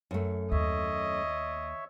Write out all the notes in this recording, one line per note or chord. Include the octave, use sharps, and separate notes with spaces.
F#2 A3
D#2 C#5 D#5 E5